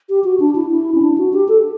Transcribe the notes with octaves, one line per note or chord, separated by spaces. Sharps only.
G4
F#4
D4
E4
E4
C#4
D4
F#4
G4
A4